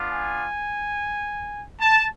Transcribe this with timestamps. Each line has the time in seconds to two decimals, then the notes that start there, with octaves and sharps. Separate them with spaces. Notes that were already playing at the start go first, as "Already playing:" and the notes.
Already playing: B3 D4 F4
0.12 G#5
1.81 A5